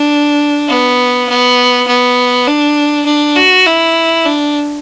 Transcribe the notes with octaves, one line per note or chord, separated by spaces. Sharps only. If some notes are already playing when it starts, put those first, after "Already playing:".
Already playing: D4
B3
B3
B3
D4
D4
F#4
E4
D4